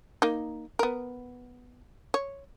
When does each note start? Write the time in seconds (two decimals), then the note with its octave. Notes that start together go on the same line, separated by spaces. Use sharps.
0.22 A#3 D#4
0.79 B3 A#4
2.14 C#5